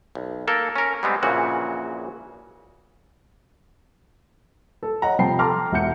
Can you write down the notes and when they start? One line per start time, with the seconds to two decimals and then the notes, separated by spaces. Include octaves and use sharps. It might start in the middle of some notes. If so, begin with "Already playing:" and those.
0.15 B1
0.47 A#3 A4 A#4
0.76 C#4 A#4
1.03 G3 G#3 B3 C4
1.23 A#1 A#2 C#3 E3 F#4
4.83 A4
5.02 C#5 D#5 F#5 A#5
5.19 C3 F3 G5 A5 B5 C7
5.39 A4 A5 A#5 C6 D6 F6
5.72 E1 E4 E5 F#5 G6 C#7